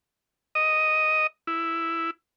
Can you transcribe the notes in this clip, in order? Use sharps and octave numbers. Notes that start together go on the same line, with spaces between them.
D#5
E4